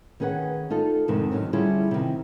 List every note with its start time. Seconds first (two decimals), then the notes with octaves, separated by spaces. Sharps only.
0.20 D#3 C#4 G#4 B4 F#5
0.70 D#4 F4 A4
1.08 F2 G#2 C3 D#3 C4
1.31 D3 D#3 F#3 C#4 D#4
1.53 D3 G3 C#4 E4 F4 G#4
1.91 C3 D#3